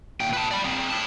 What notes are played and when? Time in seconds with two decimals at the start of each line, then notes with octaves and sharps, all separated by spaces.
0.20 A#2 G5
0.33 B4 A5
0.51 D5 B5
0.65 C4 G#4
0.90 E4 A5